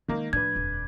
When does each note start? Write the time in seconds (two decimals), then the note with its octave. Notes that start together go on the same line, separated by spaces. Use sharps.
0.08 D#3 G#3 A#3 D#4
0.33 A2 F3 D4 B4 G#6
0.56 D#1 F2